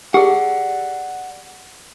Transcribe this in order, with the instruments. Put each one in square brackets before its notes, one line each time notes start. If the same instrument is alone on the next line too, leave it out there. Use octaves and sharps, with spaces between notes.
[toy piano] G4 G#4 [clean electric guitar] D5 F#5